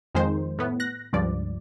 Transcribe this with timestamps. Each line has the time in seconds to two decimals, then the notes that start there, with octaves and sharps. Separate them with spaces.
0.15 F2 D#3 G#3 C5
0.59 A2 B3
0.80 F#6 A#6
1.13 C#2 G2 F3 D5